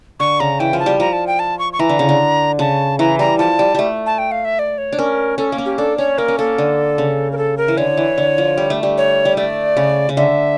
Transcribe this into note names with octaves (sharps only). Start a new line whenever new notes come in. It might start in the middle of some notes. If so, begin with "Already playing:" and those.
D3 C#6
C#3 A#5
E3 G5
F3
A5
G3
F3 A#5
A5
G5
A5
C#6
C#6
E3 A#5
D3
C#3
D3
C#3 A5
E3 A#5
G3 A#5
F3 A5
G3
G3 A3
A5
G5
F5
E5
D5
C#5
D4
C#4 A#4
C#4 A4
A#3
C#4
G4
D4 A4
C#4 C#5
A#3 A#4
C#4
A#3 A4
D3
C#3
A#4
A4
A#4
E3
D3 C#5
E3
D3
F3
G3
A3
G3
C#5
G3
A3 D5
C#3
C#3
D3 E5